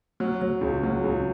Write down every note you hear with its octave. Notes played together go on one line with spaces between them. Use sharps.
F#3
F#3
C#2
F#3
C#2